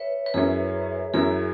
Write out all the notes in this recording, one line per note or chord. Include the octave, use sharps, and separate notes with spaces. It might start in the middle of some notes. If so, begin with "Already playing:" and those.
Already playing: B4 C#5 E5
B4
F#2 F#3 C#4 E4 G#4
F#2 F#3 C#4 E4 G#4